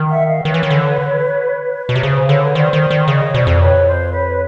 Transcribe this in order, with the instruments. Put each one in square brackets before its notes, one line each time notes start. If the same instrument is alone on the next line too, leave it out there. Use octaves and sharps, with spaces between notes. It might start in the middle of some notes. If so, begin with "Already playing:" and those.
Already playing: [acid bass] D#3
[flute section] E5 F#5
D#5 F5
[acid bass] D#3 [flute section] B4 C#5
[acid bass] E3
D#3
D3
B2
C3
[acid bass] C#3 [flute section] C5
[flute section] C5
[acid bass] D3 [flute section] B4 C#5
[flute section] B4 C#5
[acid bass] D#3 [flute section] C5 D5
[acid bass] D#3
D#3
[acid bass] C#3 [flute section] C#5 D#5
[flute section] C#5
[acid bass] B2 [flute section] C5 D5
[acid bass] F2
[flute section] B4 C#5
C5
B4 C#5